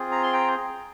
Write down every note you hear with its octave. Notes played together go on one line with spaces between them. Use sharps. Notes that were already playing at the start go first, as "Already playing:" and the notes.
Already playing: C4 F4 G#4
A#5
C6
G5 A#5